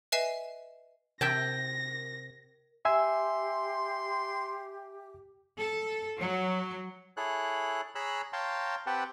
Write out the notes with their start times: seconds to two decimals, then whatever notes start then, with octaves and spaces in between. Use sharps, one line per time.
0.12 B4 D#5 E5 G#5 C7 E7
1.21 C3 A#4 E5 G5 A5 A#6
2.85 G4 E5 G#5 C6 E6
5.59 A4
6.20 F#3
7.17 E4 G#4 A4 C#5 F#6
7.95 G#4 C#5 A#5 B5 E6 F#6
8.33 C#5 F5 G5 A5 A#5 C6
8.87 C4 G4 B4 F#5 G5 A5